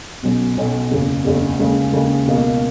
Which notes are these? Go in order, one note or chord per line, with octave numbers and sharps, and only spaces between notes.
B1 B2 F#3 C#4
B1 B2 F#3 C#4
F#1 E2 C#3
F#1 E2 C#3
D#2 C#3 G#3
D#2 C#3 G#3
C#2 B2 A#3